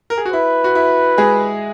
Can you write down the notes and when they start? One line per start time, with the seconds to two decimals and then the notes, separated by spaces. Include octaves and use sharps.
0.10 A#4
0.18 G#4
0.25 F#4
0.32 E4 B4
0.64 F#4
0.75 E4
1.18 G#3 G#4